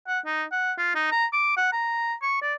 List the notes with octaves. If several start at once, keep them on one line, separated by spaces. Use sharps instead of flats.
F#5
D#4
F#5
F4
D#4
A#5
D6
F#5
A#5
C#6
D5